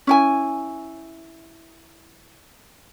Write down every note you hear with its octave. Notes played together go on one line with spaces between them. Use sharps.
C#4 E4 G#5